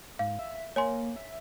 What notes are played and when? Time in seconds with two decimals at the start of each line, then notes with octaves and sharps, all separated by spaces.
0.19 G#2 F5
0.39 E5
0.76 A#3 C#5 G#5 C6
1.16 E5